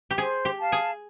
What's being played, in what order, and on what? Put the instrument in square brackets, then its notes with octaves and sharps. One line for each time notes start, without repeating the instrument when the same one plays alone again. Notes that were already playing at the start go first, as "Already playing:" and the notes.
[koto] G4
[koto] G#4 [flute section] C5
[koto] G4
[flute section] F5 A5
[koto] G#4